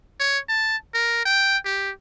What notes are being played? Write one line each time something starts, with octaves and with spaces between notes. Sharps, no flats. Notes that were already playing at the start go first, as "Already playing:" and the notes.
C#5
A5
A#4
G5
G4